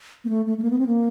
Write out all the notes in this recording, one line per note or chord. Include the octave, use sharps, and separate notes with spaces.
A#3
A3
A3
A3
A#3
B3
C4
A#3